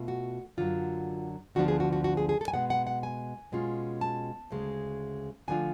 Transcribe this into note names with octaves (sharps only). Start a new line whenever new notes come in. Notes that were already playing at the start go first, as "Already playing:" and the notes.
Already playing: B2 A3 F4
F#4
F#2 D3 F#3 F4
D2 D3 F3 B3 D4 F#4
G#4
F#4
F#4
F#4
G#4
G#4
A4
G#5
B2 G#3 B3 F#5
F#5
F#5
G#5
B2 G#3 C#4 F4
A5
D2 C#3 G#3
D3 F3 A3 D4 F4 G#5